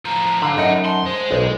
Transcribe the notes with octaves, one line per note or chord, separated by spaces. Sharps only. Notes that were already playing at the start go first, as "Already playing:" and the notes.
A2 F3 A#5
D3 A4 F5 B5
F#2 D#4 D#5 F#5
A5 C6
G#3 C5 D#5
B1